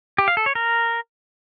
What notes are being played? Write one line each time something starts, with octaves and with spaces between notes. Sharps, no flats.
G4
F5
A4
C#5
A#4